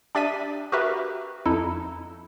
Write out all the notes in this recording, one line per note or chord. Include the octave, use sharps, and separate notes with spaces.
D4 G4 D5 E5 B6 D#7
F#4 G4 A#4 B4 E5
F2 D#4 E4 A4